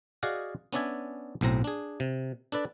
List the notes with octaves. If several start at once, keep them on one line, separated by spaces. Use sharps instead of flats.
F#4 G#4 D5 D#5 F5 F#5
B3 C#4 D4 D5 E5 G#5
B1 A2 C4 A#5
D4 G#4
C3
D4 A4 B4 D5